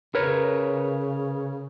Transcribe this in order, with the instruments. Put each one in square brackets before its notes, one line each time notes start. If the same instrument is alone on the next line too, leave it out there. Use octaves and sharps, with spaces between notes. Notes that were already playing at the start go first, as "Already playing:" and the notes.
[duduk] C#3 [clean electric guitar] A#4 B4 C#5